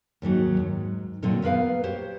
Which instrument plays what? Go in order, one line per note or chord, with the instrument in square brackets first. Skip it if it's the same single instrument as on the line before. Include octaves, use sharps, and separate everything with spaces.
[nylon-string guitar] D#2 G#2 D#3 F#3
G#2
A#2 D3 D#3 F#3 C4
B3 A#4 B4 F5
G4 C5 C#5